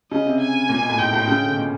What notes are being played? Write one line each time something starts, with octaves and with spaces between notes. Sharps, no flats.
C#3 D#5
C3
G#5
A#2
B2
A2
G#2 G5
A2
C#3
D3
B2
A#2